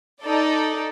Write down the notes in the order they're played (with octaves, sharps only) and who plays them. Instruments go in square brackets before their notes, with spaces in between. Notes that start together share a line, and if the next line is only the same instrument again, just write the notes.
[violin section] D#4 A4 D5